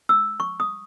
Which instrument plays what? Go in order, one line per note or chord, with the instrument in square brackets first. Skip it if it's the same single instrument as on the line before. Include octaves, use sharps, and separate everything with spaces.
[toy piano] E6
C#6
D#6